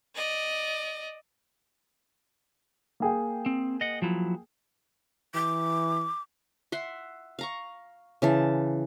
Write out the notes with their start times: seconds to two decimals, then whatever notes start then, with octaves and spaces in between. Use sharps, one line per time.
0.16 D5 D#5
3.00 A#3 G#4 G5
3.46 C4
3.81 D#5 F#5
4.02 F3 F#3 E4
5.34 E3 D6
6.72 E5 F#5 C6
7.39 F5 A#5 C#6
8.22 C#3 E3 A5